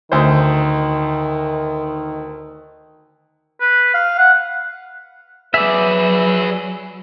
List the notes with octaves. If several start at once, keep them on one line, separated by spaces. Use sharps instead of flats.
D2 D#3 C5
B4
F5
F#5
F#3 G#4 B4 D5 E5